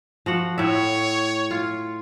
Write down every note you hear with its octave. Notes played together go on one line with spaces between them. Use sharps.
F3 F#4 F#5
A2 C#5 E5
F4